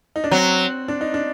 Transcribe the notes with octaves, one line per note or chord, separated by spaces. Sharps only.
D#4
D4
F#3 C4
D4
D#4
D4